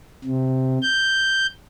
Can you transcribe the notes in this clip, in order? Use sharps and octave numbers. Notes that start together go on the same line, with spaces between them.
C3
G6